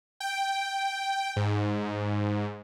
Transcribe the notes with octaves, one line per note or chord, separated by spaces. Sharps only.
G5
G#2